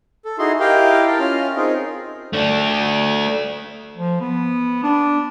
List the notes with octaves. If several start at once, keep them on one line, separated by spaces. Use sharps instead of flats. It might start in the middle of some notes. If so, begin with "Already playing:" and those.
A4
D#4 E4 F#4 G#4 C6
E4 G4 A#4 D#5 F5 G5
A#4 F5 A5
C#4 F4 F6
C4 D#4 F4 G#4 A#4
A3 D4
F3
B3
D4